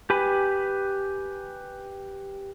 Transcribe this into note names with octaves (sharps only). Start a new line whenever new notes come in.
G4 B4 G#5 B5